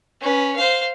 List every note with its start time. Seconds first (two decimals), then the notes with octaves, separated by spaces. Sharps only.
0.21 C#4 B4
0.56 C5 F5